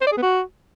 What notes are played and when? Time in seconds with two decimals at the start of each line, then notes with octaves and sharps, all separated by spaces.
0.01 C5
0.07 D5
0.12 G#4
0.17 B3
0.23 F#4